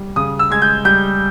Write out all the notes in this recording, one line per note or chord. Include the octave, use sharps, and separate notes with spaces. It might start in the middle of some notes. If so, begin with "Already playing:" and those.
Already playing: G3
C#3 D#6
E6
G#3 G#6
G6
G3 G6